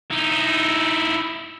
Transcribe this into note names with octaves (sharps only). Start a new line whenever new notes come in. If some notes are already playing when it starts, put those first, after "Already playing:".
D#4 E4